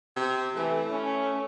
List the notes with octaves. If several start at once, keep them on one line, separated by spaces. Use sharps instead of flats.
C3
E3 A3
C#4